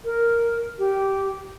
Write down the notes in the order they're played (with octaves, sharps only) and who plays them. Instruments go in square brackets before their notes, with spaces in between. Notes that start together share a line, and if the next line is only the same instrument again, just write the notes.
[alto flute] A#4
G4